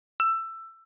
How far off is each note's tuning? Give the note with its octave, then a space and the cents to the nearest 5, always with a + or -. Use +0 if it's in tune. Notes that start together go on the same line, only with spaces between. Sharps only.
E6 +15